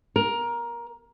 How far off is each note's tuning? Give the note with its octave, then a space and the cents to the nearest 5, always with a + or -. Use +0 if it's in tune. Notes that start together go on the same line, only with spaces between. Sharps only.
A#4 +15